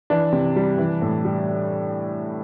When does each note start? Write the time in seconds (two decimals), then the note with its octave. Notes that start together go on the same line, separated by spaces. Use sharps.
0.10 E3 D4
0.32 C3
0.56 G3
0.78 E3
1.02 A2
1.25 G3